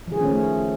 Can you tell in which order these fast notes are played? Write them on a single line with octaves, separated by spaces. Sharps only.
F3 G#4 D#3 C#4 A3